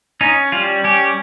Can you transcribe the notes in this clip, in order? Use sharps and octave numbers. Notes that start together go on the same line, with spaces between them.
C#4 D#4
G3 F4
C#4 G4